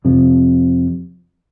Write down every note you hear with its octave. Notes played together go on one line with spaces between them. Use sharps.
F2 C3 F3